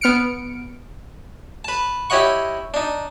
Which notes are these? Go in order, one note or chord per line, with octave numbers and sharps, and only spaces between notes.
B3 F6 C#7 D7
B4 A5
E4 G4 C#5 D#5 F#5 C#6
D4 D#4